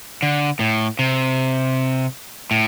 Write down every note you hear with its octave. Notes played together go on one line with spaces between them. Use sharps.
D3
A2
C3
A2